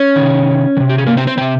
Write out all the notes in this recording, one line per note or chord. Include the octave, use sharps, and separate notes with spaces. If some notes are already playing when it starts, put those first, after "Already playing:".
Already playing: C#4 C#5
C3 D#3
D#3
C3
G4
G#4
A#3 A#4
C4 C5
C4 C5
C3 D#3 C4 C5